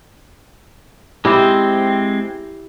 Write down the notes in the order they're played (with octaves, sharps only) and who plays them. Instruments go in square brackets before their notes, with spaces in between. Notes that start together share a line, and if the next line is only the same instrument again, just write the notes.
[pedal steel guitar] G#3 C4 C5 [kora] E4 G4